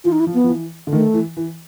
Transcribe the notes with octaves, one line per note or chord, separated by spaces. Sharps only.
E3 F4
D#4
E4
F3
B3
F3
E3
D3
D#3 A3
E3
E3